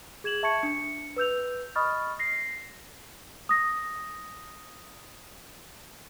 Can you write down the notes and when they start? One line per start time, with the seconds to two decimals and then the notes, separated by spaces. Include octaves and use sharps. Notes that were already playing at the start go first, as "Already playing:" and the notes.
0.24 G#4 G#6 E7 F#7
0.43 E5 A5 C#6 G#6 C#7
0.63 D4 C#7
1.16 B4 E6 G6 F7
1.75 D#5 B5 C#6 D#6 F6 A6
2.19 A#6 C7
3.49 D#6 A#6